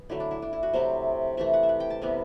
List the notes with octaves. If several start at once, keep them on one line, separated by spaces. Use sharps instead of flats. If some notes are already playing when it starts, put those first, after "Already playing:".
Already playing: B3
D3 F#3 A3 E4
D4
E4
D4
E4
F#4
C3 F#3 A3 C4 C5
C3 E3 A3 E5
F#5
E5
F#5
G5
A5
C3 E3 G3 B3